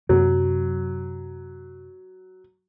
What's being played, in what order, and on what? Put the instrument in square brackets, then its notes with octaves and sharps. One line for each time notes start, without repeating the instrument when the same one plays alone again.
[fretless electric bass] F#2 C3 [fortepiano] F#3